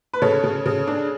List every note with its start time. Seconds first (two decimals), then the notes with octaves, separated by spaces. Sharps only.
0.14 B4
0.22 C#3 A4 C#5
0.44 C#3
0.66 C#3
0.87 D4